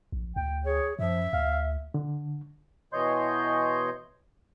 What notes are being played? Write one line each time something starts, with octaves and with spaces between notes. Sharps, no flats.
A#1
D2 G5
G#4 C#5
F#2 F3 E5
D2 F5
D3
B2 E3 C#5 D#5 C6 G6